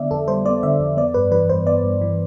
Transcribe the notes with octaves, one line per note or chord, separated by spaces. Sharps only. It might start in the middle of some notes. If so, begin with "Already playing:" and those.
Already playing: D3 B3 D5 E5
F2 A4
G3 C5
B3 D5
D3 E5
F2
B3 D5
G2 B4
E3 B4
G2 C5
B3 D5
G2
E3